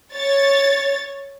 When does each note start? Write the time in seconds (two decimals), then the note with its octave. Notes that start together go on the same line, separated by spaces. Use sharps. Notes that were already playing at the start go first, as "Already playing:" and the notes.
0.15 C#5 A6